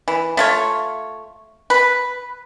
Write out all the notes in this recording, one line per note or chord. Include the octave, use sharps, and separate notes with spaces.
E3
A3 F4 C#5
B4